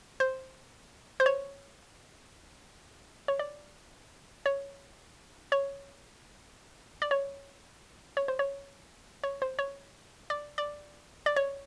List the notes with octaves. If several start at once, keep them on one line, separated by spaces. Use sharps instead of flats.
C5
C5
C#5
C#5
D5
C#5
C#5
D5
C#5
C#5
C5
C#5
C#5
C5
C#5
D5
D5
D5
C#5